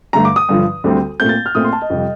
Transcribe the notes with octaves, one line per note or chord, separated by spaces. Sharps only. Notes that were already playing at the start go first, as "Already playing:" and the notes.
G2 D3 A3 A#5
D6
D#6
G2 D3 F3
D2 D3 G3 C4
A#2 A3 C4 G6
A6
F6
A#2 A3 C4 D#6
C6
A5
D#5
F2 C3 G3